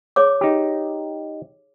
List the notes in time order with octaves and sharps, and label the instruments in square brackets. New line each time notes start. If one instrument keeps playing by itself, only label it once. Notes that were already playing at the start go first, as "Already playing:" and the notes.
[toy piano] G#4 C#5 D6
[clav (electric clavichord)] D#4 G4